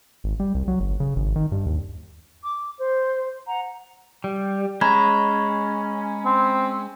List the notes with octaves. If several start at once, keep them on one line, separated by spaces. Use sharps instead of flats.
G#1
G3
C2
F#3
G1
C#3
G#1
D#3
G2
D#2
D6
C5
F#5 A#5
G3
G#3 C#4 A#5 B5 G#6
C4